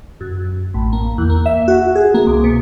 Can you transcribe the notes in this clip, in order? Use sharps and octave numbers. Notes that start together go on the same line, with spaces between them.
F#2
A1
A#3
E2
A#3
E5
F#4
G#4
A#3
C2
B2